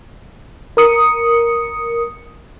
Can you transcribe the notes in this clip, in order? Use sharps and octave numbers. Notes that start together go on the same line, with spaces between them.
A#4 D#6 C#7